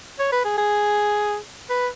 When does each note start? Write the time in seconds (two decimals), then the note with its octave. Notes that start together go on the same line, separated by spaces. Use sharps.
0.19 C#5
0.32 B4
0.45 G#4
0.58 G#4
1.70 B4